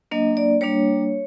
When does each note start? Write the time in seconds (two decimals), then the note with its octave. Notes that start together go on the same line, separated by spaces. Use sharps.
0.11 F#3 A#3 D4 D#5
0.37 D5
0.61 G3 A#3 D4 C#5